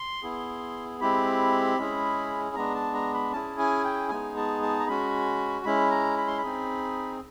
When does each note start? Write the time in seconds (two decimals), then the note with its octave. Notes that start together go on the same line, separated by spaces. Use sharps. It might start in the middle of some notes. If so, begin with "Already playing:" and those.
Already playing: C6
0.23 B3 E4 G#4
1.01 G#3 C4 E4 G4 B5
1.78 G#3 C#4 E4 G#4
2.56 G#3 B3 D4 A#5
2.75 A5
2.94 A#5
3.14 B5
3.33 C#4 E4 G#4 A5
3.59 G#5
3.84 G5
4.10 G#3 B3 D#4 G#4 G#5
4.37 A5
4.63 A5
4.80 A#5
4.88 G#3 C#4 F#4 B5
5.65 G#3 C#4 E4 B5
5.91 A#5
6.17 B5
6.28 C6
6.38 B5
6.43 C4 D#4 G#4